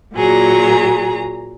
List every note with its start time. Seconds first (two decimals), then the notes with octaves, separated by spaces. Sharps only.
0.15 A#2 F#3 G#4 A#5